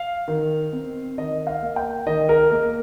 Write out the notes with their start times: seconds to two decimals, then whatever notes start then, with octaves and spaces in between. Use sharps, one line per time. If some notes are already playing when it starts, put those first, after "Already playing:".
Already playing: F5
0.28 D#3
0.73 C4
1.18 D#3 D#5
1.47 F5
1.62 A#3
1.76 G5
2.07 D#3 D#5
2.29 A#4
2.51 A#3 A#4